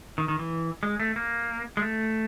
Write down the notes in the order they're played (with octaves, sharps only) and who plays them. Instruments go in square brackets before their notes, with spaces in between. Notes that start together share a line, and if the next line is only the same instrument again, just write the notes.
[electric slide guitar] D#3
D#3
E3
G#3
A3
A#3
G#3
A3